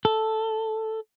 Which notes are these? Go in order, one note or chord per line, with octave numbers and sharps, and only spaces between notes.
A4